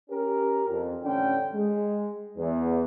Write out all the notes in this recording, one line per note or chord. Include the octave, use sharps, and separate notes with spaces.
C#4 G4 A#4
F2
A1 D3 C#4 D4 G5
G#3
E2